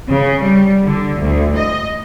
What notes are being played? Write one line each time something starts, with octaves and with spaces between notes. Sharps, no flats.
C#3
G3
D3
D2
D#5